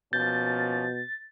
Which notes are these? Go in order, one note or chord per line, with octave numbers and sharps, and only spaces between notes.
B2 F3 A#3 C#4 G6 A6